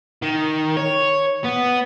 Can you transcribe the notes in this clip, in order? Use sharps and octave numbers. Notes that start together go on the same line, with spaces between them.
D#3
C#5
B3